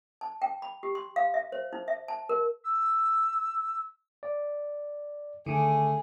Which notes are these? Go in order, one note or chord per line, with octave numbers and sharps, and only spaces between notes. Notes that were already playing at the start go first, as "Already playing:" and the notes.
A5
G5
B5
G4
C6
F5
E5
C5
D#4
E5
A5
A#4
E6
D5
D3 D#3 A3 G#4